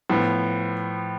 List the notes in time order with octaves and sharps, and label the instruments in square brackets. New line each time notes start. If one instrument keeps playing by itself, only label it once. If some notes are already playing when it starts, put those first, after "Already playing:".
[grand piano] A2 F3 B3